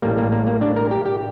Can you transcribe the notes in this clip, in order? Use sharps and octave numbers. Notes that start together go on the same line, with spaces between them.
A1 A2 G3 A#3
A#3
A#3
A#3
D4
A#4
G4
G4